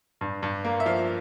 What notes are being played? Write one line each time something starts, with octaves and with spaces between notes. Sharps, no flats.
G2
G2
A#3
E5
F3 F5